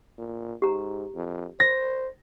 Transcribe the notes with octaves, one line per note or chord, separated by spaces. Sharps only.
A#2
G#2 G4 A#5
F2
C5 A#6